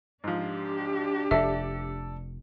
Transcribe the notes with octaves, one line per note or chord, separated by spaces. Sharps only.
G#2 F3 D4 G4
F1 A4 D5 E5